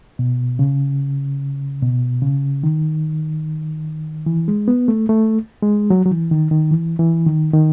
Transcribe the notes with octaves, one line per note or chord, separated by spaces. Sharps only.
B2
C#3
B2
C#3
D#3
E3
G#3
B3
A3
A3
G#3
F#3
F#3
E3
D#3
D#3
E3
E3
D#3
D#3